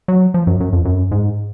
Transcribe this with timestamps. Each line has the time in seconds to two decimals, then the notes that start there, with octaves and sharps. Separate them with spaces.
0.08 F#3
0.34 F3
0.47 F#2
0.60 F#2
0.73 F2
0.85 F#2
1.11 G#2